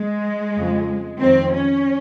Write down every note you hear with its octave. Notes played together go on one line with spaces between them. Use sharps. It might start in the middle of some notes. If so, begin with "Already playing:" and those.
Already playing: G#3
F2 C#3
F2 D#3 C4
C#4